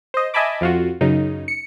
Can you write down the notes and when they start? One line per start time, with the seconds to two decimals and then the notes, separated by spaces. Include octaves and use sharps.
0.14 C5 D#5
0.34 D#5 E5 G#5 A5 B5 D6
0.61 F2 F4 F#4
1.01 F#2 C#3 D#4
1.48 C#7